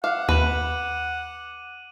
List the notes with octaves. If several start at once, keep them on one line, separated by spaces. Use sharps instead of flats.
F5 F#5 D6
D#2 B4 D#7 F#7